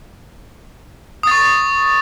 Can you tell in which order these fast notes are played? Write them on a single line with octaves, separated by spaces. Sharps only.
D#6 A6 C#6